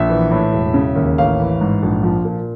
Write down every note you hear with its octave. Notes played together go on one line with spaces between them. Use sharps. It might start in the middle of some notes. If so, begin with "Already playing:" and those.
Already playing: A#1 E5
E3
A2
E1
C#3
D#2
A1 F5
E3
G#2
A#1
F3
A#2